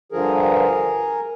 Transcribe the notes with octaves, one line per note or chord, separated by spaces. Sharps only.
G2 D3 F3 G#4 A#4